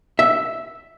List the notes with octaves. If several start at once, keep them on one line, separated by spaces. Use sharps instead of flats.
E5